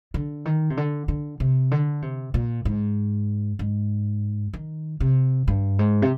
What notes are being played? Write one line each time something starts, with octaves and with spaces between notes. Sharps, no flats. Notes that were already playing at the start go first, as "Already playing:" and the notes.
D3
D#3
C3
D3
D3
C3
D3
C3
A#2
G#2
G#2
D#3
C3
G2
G#2
C3